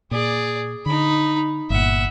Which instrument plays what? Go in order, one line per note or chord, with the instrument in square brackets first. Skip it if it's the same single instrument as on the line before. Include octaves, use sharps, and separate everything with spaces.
[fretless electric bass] A#2 [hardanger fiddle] G#4 D5
[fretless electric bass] D3 [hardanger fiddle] D#4 B5
[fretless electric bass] G1 A#2 [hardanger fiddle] E5 F#5